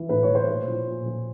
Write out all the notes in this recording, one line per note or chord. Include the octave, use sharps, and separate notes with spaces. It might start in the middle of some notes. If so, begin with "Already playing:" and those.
Already playing: E3
A2 B4
C#5
E3
C5
A#2
F3
A#2
F3